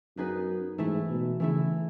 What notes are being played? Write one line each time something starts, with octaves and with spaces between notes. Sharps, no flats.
F#2 B3 D#4 G#4 B4
G#2 E3 A3 E4
B2
C#3 E3 A3 E4